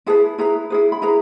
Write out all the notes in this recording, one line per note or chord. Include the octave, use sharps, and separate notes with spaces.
E4 G#4 B4 A5
E4 G#4 B4 A#5
E4 G#4 B4
B5
E4 G#4 B4 A#5